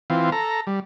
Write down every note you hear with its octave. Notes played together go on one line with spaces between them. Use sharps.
E3 C4 F4
A4 A#5
G3